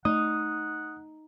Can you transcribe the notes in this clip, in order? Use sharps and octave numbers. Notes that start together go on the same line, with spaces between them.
A3 D#4 F#5 D#6